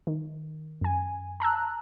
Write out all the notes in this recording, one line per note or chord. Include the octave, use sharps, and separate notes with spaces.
D#3
F#2 G#5
A5 A#5 E6 F#6